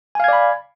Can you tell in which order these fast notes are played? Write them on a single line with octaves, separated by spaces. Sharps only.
G#5 F5 G#6 D5 B5